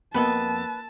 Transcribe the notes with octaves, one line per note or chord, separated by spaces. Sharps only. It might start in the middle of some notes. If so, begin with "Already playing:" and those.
F2 A#3 B3 A#4 B4 D#5 A5 E6